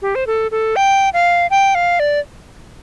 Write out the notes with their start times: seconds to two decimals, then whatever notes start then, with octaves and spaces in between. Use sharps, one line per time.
0.02 G4
0.15 C5
0.27 A4
0.51 A4
0.76 G5
1.13 F5
1.51 G5
1.75 F5
2.00 D5